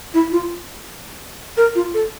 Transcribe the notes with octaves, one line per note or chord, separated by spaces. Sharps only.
E4
F4
A#4
F4
A4